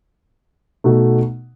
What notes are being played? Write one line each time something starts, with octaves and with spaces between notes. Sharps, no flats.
B2 A3 D#4 F#4